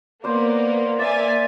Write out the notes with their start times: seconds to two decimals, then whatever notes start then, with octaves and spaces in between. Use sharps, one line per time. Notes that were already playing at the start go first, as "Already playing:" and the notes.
0.24 A#3 B3 C5 D5
0.99 A#3 D5 E5 G#5 A6